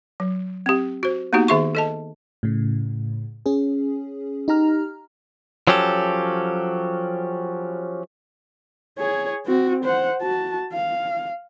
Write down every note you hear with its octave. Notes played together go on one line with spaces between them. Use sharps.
F#3
C4 G4
F#4 C5
A#3 B3 D#4 F#4 G4
D#3 G#4 E5 C6 C#6
A4 D#5 A5
A2 C#3
C#4 G#4
D#4 G4 A#5 F6
F3 F#3 C#4 G4 A4
G#4 C#5
C4 F#4
C5 F#5
F#4 A5
F5